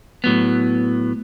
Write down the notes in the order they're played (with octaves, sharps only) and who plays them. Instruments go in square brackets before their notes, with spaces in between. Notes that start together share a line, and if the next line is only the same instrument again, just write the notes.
[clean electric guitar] A2 F#3 B3